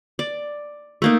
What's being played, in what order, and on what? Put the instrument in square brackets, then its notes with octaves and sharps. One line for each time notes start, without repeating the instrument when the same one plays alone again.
[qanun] D5
A3 A#3 D#4